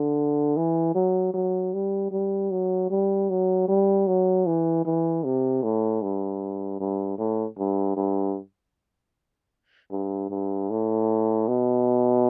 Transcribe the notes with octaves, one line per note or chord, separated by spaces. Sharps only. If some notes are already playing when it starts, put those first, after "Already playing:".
Already playing: D3
E3
F#3
F#3
G3
G3
F#3
G3
F#3
G3
F#3
E3
E3
C3
A2
G2
G2
A2
G2
G2
G2
G2
A2
B2